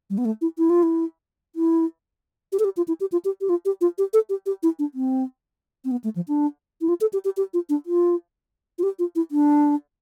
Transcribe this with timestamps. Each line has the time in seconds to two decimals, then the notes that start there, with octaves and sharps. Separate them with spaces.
0.10 G3
0.18 B3
0.25 A3
0.41 E4
0.58 E4
0.70 F4
0.83 E4
1.56 E4
2.52 G4
2.59 A4
2.64 G4
2.77 F4
2.88 E4
3.01 G4
3.12 F4
3.25 G4
3.41 G4
3.49 F4
3.65 G4
3.81 F4
3.98 G4
4.13 A4
4.30 G4
4.46 G4
4.63 E4
4.79 D4
4.94 C4
5.85 C4
5.91 B3
6.04 A3
6.16 F3
6.28 D4
6.81 E4
6.89 F4
7.01 A4
7.13 G4
7.25 G4
7.37 G4
7.54 F4
7.69 D4
7.86 F4
8.79 F4
8.83 G4
8.99 F4
9.16 E4
9.31 D4